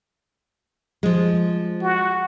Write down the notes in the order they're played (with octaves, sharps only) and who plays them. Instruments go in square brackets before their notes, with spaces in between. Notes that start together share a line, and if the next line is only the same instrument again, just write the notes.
[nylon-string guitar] F3 G#3
[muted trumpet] F#4